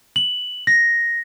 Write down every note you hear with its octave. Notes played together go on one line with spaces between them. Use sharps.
F#7
A#6